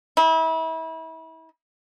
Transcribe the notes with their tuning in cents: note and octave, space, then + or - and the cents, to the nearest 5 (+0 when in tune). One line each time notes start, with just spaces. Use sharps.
E4 -35